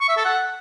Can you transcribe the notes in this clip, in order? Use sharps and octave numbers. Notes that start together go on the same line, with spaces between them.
C#6
E5
A4
F#5